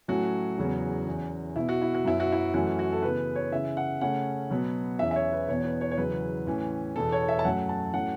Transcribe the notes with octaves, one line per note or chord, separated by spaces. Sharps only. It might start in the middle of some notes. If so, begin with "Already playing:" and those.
A2 F#3 A3 C#4 F#4
E2 C#3 F#3 B3
E2 E3 C#4
B2 B3 E4
F#4
E4
F#4
F#2 F#3 B3 E4
F#4
E4
F#2 E3 A3 C#4 F#4
F#4
A4
C#3 E3 B3 B4
C#5
C#3 E3 C#4 E5
F#5
C#3 A3 C#4 F#5
B2 F#3 B3
E2 E3 C#4 E5
E5
C#5
B4
E2 B2 B3 C#5
B4
C#5
C#5
E2 C#3 F#3 B4
A2 E3 C#4
E2 B2 B3 A4
C#5
E5
A5
F#2 F#3 A3 C#4 F#5
A5
A2 F#3 A3 C#4 F#5